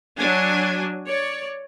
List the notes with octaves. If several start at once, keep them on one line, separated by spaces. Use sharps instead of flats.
F#3 D4 G#5
C#5 D5